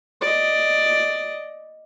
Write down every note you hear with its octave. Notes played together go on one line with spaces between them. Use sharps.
D5 D#5